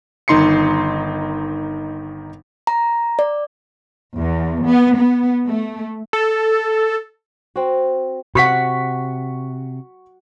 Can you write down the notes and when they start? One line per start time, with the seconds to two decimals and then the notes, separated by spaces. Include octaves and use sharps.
0.28 G1 D#3 D#4 C6 C7 C#7
2.67 A#5
3.19 D5
4.16 E2
4.66 B3
4.97 B3
5.49 A3
6.13 A4
7.56 C4 F#4
8.35 C3 F#4 F#5 C#6 B6